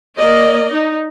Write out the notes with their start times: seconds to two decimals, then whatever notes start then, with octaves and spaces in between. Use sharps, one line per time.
0.17 A#3 D5 D#5
0.72 D#4